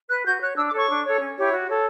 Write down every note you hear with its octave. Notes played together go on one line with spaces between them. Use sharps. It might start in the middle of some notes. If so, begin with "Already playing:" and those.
B4 F#6
F#4 G6
C#5 F#6
D4 E6
D6
A4 C#5 C#6
D4
A4 C#5
C#4
E4 G4 C#5
F#4
A4 C#5